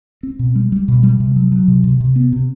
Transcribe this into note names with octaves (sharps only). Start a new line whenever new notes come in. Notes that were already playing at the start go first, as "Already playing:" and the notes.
C4
B2
G3
G3
B2
G3
C3
F#3
F#3
C3
C3
C3
B3
C3